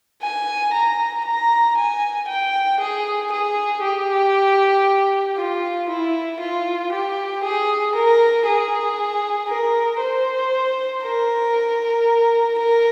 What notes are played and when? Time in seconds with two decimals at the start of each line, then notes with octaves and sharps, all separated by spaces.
0.22 G#5
0.73 A#5
1.25 A#5
1.77 G#5
2.28 G5
2.80 G#4
3.32 G#4
3.83 G4
5.37 F4
5.89 E4
6.40 F4
6.92 G4
7.43 G#4
7.95 A#4
8.46 G#4
9.48 A#4
10.00 C5
11.03 A#4
12.58 A#4